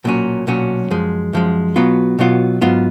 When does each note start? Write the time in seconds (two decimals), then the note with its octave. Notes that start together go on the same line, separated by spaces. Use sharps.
0.04 B1 A#2 F#3 C#4
0.47 B1 A#2 F#3 C#4
0.91 F#2 F3 G#3
1.33 F#2 F3 G#3
1.76 B2 F#3 B3 F4
2.19 B2 F#3 B3 F4
2.61 G#2 F#3 B3 F4